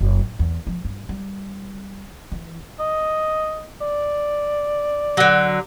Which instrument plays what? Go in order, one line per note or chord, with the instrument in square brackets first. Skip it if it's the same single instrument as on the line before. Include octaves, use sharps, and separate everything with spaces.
[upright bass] F#1
A2
E2
F3
G2
G3
E3
[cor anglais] D#5
D5
[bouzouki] D3 F#3